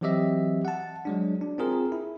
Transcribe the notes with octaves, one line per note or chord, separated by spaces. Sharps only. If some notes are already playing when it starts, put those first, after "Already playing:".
E3 F#3 C4 G4 D#5 E5
F#5 A5
F#3 G#3 D4
D4
C4 F4 G#4 A#4
E4